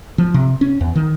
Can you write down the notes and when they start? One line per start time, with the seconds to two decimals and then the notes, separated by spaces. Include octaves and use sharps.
0.18 F3
0.34 C3
0.61 C#4
0.81 E2
0.95 D#3